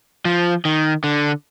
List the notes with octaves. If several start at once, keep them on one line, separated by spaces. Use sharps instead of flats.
F3
D#3
D3